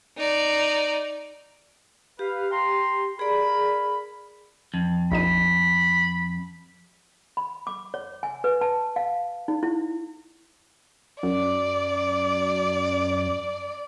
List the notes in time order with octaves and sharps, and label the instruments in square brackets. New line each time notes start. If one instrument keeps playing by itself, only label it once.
[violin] D#4 D5
[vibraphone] G4 [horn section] B4 F5
[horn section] G5 A#5 C6
[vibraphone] G#4 D5 [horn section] A#4 B5
[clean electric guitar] F2
[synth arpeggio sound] A#1 D#4 D#7 [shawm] B5
[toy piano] B5
D6
C#5
G#5
B4
A5
F5
D#4
E4
[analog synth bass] F#2 [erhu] D5